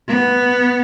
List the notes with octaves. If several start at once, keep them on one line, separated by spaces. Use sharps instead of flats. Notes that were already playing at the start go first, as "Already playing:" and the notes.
B3